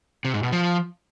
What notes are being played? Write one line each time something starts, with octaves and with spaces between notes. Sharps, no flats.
C3
G#2
B2
F3